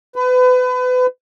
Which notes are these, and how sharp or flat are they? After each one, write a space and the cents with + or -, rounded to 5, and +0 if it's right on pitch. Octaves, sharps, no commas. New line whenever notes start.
B4 +30